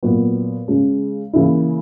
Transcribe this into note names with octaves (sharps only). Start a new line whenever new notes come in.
A#2 F#3 B3 F#4
C#3 G#3 C#4
C#3 E3 A#3 E4